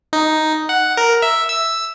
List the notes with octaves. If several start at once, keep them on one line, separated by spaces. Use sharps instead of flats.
D#4
F#5
A#4
E5
E6